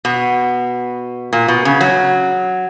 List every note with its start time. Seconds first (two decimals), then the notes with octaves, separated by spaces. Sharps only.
0.05 B2
1.33 A#2
1.48 B2
1.65 C#3
1.81 F#3